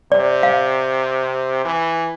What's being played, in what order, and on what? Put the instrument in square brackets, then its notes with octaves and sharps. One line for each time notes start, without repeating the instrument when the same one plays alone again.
[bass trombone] C3 [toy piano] D5
[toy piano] F5
[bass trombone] E3